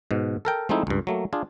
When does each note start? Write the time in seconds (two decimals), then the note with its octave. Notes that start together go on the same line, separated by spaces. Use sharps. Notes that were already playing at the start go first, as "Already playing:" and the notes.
0.11 G#2 B2
0.45 A4 A#4 G5
0.69 F3 G#3 A3 C4 D#4 E4
0.87 C#2 G2
1.07 F#3 A3 A#3
1.33 D4 F4 G#4